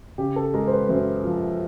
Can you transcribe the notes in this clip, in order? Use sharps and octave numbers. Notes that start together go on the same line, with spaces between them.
C#3 G4
A4
G#3 A#4
C5
B4
F#2 C5
F3